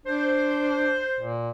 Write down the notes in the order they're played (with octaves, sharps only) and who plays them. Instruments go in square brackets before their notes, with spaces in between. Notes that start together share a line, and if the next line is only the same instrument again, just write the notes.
[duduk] D4 [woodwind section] C5
[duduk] A#2